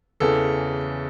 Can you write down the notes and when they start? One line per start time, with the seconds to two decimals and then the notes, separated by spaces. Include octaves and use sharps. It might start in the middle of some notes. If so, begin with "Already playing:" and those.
0.20 E2 C#3 E3 A4